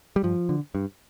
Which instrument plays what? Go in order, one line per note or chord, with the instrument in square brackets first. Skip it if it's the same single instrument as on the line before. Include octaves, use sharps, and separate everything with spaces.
[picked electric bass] G3
G2 F3
D3
G2